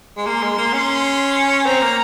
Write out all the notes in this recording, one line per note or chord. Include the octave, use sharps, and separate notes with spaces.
G#3
A#3 C6
G#3
A#3
C#4
C4 A#5
A#3